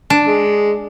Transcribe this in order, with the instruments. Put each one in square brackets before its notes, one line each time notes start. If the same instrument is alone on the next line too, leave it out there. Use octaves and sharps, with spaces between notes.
[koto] D4
[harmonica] G#3